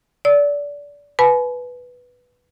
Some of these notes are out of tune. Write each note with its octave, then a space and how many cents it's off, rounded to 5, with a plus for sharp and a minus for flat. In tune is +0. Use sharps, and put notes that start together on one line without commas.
D5 -25 E6 -25
B4 +0 G#5 +40 B5 +0